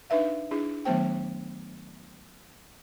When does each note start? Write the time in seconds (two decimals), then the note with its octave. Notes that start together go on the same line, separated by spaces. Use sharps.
0.10 D4 D#4 B4 E5 F5
0.51 D4 E4 G#4
0.85 D#3 F#3 A3 B3 C5 G5